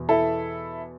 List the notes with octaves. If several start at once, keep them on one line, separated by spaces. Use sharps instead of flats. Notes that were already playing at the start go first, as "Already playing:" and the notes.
Already playing: E2 B2
E4 A4